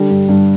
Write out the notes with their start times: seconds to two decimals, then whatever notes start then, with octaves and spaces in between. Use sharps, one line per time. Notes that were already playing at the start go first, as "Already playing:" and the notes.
Already playing: D3 G3
0.10 G2
0.29 G2